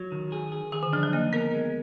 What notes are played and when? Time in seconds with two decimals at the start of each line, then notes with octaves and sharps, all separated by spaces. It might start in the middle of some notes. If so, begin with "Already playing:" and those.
Already playing: F#3
0.12 D#3
0.32 G#4
0.52 G#4
0.72 D#3 G#4
0.83 D3
0.93 F3 D4
1.03 F#3
1.13 A#3 D#4
1.33 B3 A#4
1.53 G#3